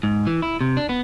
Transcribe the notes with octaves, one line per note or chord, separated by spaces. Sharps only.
G#2
E3
E4
C3
D4
B3